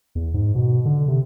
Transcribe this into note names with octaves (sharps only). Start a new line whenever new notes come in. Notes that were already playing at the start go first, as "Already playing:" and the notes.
E2
G#2
B2
D3
C3